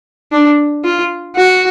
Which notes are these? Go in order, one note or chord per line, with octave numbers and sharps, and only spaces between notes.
D4
F4
F#4